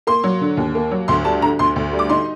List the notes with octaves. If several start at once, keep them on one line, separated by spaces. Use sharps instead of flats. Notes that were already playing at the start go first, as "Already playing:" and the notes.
A#3 C6
F#3
D3
D#2
A#3
F#3
D2 C6
G3 A5
D3 A#5
D2 C6
D2
G3
D6
D#4 C6